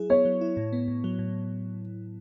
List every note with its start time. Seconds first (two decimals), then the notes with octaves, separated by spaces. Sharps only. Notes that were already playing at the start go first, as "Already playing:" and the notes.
Already playing: F#3 E4 G#4
0.10 B3 C#5
0.25 F#3
0.41 E4
0.57 A2
0.73 B3
0.88 A2
1.04 F#3
1.19 A2